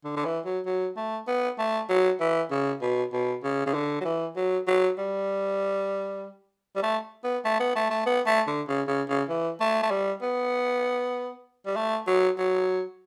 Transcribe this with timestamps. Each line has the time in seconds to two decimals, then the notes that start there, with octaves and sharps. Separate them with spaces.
0.04 D3
0.16 D3
0.25 E3
0.45 F#3
0.66 F#3
0.97 A3
1.27 B3
1.59 A3
1.89 F#3
2.20 E3
2.51 C#3
2.82 B2
3.13 B2
3.44 C#3
3.66 C#3
3.74 D3
4.01 F#3
4.05 E3
4.36 F#3
4.67 F#3
4.98 G3
6.76 G3
6.83 A3
7.24 B3
7.45 A3
7.60 B3
7.75 A3
7.90 A3
8.06 B3
8.26 A3
8.47 D3
8.68 C#3
8.88 C#3
9.09 C#3
9.29 E3
9.60 A3
9.82 A3
9.91 G3
10.22 B3
11.66 G3
11.76 A3
12.07 F#3
12.38 F#3